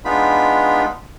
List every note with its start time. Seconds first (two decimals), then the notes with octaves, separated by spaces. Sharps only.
0.05 G#3 B3 D4 D#4 F4 B5